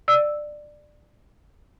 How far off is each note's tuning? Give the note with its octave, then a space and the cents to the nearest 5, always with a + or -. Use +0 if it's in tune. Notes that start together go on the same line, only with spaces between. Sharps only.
D5 +15 E6 +0